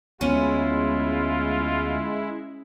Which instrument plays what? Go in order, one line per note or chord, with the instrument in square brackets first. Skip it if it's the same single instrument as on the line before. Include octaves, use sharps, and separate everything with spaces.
[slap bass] D2 B3 [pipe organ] G#3 E4 [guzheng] C#4 [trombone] F4